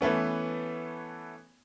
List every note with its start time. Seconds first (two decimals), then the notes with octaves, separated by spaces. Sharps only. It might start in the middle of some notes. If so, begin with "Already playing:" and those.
0.01 E3 A3 B3 C#4